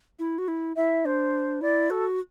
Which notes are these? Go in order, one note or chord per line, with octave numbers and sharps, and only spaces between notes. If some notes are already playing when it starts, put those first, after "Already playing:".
E4
F#4
E4
E4 E5
D4 C5
E4 D5
F#4 A4